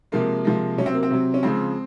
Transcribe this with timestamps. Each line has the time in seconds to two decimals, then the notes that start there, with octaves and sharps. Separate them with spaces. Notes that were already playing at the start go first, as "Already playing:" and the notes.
0.12 C3 F3 G#3 A#3
0.45 C3 F3 G#3
0.78 C3 F#3 C#4
0.86 C4
0.94 A#3
1.03 C4
1.11 C3 F#3
1.34 C#4
1.43 C#3 F3 G#3 C4